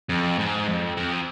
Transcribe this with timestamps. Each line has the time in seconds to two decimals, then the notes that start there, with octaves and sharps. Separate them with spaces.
0.09 F2
0.39 G#2
0.68 F2
0.97 F2